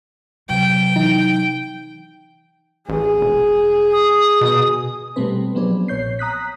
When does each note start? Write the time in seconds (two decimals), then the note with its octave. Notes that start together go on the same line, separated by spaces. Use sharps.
0.49 C3 F#3 G5
0.96 E3 D#4
2.89 A1 G#4
3.21 E1
3.93 D#6
4.41 B2
5.16 B2 G3 A3 C4 B4
5.55 F3 F#3 B3 C4 D4 G#4
5.88 A#1 A#2 C#5 G6 C7
6.19 A#5 D#6 F#6 B6